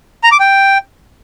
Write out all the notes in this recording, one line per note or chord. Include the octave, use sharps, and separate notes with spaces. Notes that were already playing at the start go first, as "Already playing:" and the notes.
A#5
D6
G5